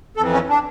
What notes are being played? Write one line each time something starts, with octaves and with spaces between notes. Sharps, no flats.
F2 E3 A4
C#4
D4